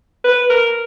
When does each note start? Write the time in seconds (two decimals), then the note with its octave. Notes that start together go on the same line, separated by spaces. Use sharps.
0.24 B4
0.50 A#4